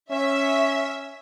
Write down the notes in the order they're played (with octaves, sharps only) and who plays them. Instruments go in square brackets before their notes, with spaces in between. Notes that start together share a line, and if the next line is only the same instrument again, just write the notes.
[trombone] C#4 [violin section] E5